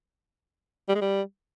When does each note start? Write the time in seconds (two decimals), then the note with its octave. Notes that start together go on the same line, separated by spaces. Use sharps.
0.89 G3
0.95 G#3
1.01 G3